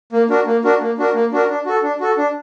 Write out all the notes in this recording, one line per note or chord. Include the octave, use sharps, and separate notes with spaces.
A#3
D4 F#4 A#4
A#3
D4 F#4 A#4
A#3
D4 F#4 A#4
A#3
D4 F#4 A#4
D4
F#4 A4
D4
F#4 A4
D4